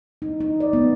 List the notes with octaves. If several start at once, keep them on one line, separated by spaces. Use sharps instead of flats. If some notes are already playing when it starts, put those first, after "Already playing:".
D#4
D#4
D5
B3